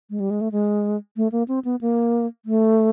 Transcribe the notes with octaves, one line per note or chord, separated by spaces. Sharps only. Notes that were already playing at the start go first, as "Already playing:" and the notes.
G#3
G3
G#3
A3
G#3
A3
A#3
C4
B3
A#3
A3